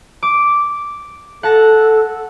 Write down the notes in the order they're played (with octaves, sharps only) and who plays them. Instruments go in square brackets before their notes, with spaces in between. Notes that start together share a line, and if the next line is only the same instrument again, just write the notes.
[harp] D6
[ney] A4 [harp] F#5 A5 A#6